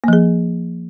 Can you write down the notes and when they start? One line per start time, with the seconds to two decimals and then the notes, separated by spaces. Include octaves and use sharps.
0.04 A#3
0.08 F3
0.13 G#4